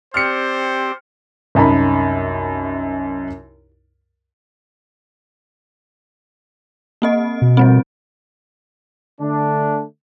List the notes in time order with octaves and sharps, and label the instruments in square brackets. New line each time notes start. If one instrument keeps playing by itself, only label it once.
[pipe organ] C4 G4 D5 [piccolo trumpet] C5 [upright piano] F6 C#7
[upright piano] C2 F#2 D#4 A5 B5
[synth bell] A#3 C4 D#5
[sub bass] B2
[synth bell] F3 G3 C4
[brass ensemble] D3 A3 D4